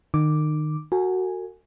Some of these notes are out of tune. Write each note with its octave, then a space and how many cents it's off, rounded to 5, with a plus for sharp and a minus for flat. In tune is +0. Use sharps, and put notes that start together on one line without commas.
D#3 -30 D6 +0
F#4 +0 A4 +45 G#5 +0